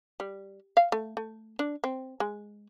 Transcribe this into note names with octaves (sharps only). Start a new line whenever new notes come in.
G3
F5
A3
A3
D4
C4
G#3